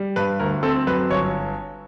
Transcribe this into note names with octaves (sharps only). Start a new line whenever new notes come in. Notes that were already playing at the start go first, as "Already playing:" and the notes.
Already playing: G3
G2 B4
D2 A#4
C4 A4
F#2 B4
G1 C#5